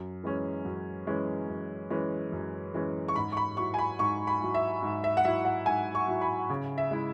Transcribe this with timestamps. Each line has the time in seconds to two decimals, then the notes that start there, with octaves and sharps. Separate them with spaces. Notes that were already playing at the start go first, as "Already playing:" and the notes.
Already playing: F#2
0.24 E3 G#3 C#4
0.65 F#2
1.07 E3 G#3 C#4
1.49 F#2
1.90 E3 G#3 C#4
2.32 F#2
2.74 E3 G#3 C#4
3.08 C#6
3.15 G#2 B5
3.32 C#6
3.37 B5
3.57 F#3 E4 C#6
3.74 G#5
3.79 B5
3.99 G#2 C#6
4.27 B5
4.41 F#3 E4
4.54 E5
4.83 G#2
5.04 E5
5.17 F#5
5.25 F#3 E4 E5
5.45 F#5
5.66 G#2 G#5
5.95 C#6
6.08 F#3 E4
6.22 B5
6.50 C#3
6.78 E5
6.91 G#3 E4